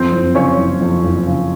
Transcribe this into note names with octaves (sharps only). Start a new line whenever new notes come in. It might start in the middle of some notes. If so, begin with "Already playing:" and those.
Already playing: F2 C4 C5
F#1
C#3 C#4 C#5
F#1
F2
F#1
C#3